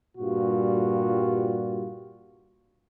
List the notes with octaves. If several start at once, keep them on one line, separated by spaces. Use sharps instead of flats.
G2 A#2 G3 F4 F#4